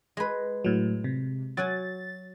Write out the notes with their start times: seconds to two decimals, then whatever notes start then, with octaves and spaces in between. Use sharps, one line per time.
0.17 G#3 B4
0.64 A2 F#3
1.04 C3
1.57 F#3 F#5 G#5 A6